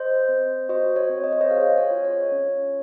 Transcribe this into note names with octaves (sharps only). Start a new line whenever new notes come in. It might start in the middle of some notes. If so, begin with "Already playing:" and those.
Already playing: C5 D#5
C4
F#4 C5 D#5
C#5
C4
D#5
C#5
C5 D#5
G#4 C#5 F5
C#5
F4
C#5
C#4